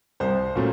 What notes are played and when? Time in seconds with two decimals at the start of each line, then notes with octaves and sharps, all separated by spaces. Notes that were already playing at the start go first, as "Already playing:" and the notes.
0.20 C2 C5
0.56 A#2 F#3 A3 C#4